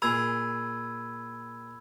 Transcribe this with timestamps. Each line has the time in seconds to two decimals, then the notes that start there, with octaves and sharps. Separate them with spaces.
0.02 A#2 G#4 B5 E6 G#6